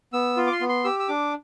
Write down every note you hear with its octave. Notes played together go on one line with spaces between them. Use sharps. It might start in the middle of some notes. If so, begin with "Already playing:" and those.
B3 E6
F4
D6
C6
B3
C6
G4 E6
E6
D4 D6